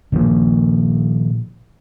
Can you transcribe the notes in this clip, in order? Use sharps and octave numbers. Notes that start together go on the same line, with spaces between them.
A#2 D#3 F3 A#3